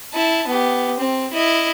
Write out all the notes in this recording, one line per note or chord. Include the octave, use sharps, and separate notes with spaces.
E4 A5
B3 G4
C4
E4 D#5